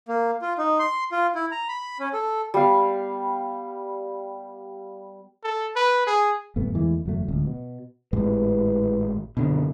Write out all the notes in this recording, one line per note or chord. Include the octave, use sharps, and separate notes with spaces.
A#3
F4
D#4
C6
F4
E4
A#5
B5
C#4
A4
G3 B3 F5
A4
B4
G#4
D#1 G2 A3 B3
E2 E3 G#3 A3
F#1 E2 F#3 A3
D1 C#2
B2
G#1 A2 G#3 E4 G4 B4
F#1 B2 D3